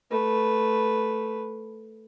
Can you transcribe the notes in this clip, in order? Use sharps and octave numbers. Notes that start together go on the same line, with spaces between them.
A3 B4